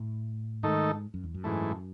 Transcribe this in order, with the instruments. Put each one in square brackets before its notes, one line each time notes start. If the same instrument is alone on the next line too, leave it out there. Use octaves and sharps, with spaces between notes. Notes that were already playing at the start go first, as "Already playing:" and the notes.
Already playing: [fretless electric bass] A2
[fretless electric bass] G#2 [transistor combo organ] D#3 A3 D#4 A4
[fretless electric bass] F#2
E2
F#2
[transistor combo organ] G#2 E3 A3